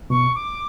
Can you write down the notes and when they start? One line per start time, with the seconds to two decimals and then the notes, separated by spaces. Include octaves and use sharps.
0.10 B2 C#6
0.35 D6